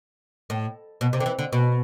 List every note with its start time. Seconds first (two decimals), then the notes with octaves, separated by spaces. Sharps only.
0.50 A2
1.01 B2
1.13 C3
1.20 D3
1.26 E3
1.39 D3
1.53 B2